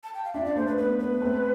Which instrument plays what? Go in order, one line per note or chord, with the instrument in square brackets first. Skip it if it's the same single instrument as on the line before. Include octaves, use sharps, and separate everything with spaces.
[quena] A5
G5
F5
[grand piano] D4 F4 [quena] E5
[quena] D5
[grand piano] A3 [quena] C5
[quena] B4
[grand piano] B3 [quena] B4
[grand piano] B3 [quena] B4
[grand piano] A3 C4